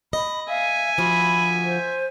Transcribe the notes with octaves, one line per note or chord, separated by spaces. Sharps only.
D#5 B5
E5 F5 G#5
D2 F3 F#4 B5
C5